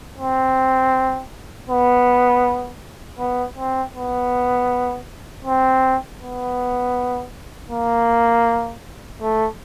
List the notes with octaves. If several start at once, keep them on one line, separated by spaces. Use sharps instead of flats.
C4
B3
B3
C4
B3
C4
B3
A#3
A3